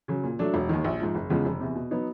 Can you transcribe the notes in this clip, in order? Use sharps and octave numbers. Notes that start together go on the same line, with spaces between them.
C#3 F#3
A#2
F#3 A3 D4
E1
D#2 D#3
A#1
G#2 F3
F#1
E2 C#3 F3 G#3
F1
E2 C3
B2
F#3 B3 D#4